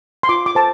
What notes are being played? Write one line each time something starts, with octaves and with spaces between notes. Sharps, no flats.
C6
F4 D6
D6
A4 C5 A5